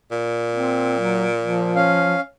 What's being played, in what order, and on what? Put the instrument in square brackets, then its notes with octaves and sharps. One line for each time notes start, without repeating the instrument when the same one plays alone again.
[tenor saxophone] A#2
[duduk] C4
F#3
F3
[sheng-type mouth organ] C#4 F5